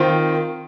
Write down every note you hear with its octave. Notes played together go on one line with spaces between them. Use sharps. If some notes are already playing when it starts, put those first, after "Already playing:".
Already playing: D#3 C4 F4 C5